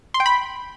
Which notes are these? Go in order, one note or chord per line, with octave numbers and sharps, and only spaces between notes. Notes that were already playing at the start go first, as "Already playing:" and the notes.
C6
G5
B5